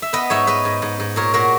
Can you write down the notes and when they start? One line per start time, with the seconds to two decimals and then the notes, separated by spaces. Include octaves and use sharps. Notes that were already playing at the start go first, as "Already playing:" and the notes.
0.02 E5
0.13 B3 B4 D#5
0.30 G#2 C#5 E5
0.47 G#2 B4 D#5
0.65 G#2
0.82 G#2
1.00 G#2
1.16 A#2 A#4 C#5
1.34 A#2 F#4 A#4